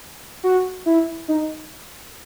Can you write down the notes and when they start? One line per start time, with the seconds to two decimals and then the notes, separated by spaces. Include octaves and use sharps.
0.44 F#4
0.86 E4
1.28 D#4